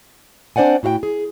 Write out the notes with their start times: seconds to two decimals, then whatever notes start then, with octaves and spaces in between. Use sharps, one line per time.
0.56 C4 D4 C5 D5 F#5 G#5
0.83 A2 E4 F#4 F5 G5
1.03 G#4